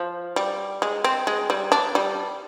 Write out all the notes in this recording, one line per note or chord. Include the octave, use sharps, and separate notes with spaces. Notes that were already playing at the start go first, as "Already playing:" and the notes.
Already playing: F3
G3
G#3
C4
G#3
G3
D4
G3